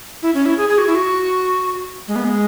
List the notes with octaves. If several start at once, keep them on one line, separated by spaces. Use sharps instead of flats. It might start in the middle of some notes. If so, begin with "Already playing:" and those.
E4
C#4
E4
G#4
G#4
F#4
E4
F#4
G#3
B3
G#3